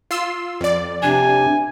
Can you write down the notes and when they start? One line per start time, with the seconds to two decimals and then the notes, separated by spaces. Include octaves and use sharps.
0.11 F4 C6 E6
0.61 F2 D5
1.03 C3 D4 G#5